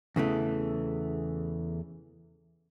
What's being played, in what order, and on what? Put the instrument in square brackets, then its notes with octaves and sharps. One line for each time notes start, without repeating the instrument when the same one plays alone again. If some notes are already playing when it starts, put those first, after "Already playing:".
[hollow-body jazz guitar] E2 C#3 E3 A3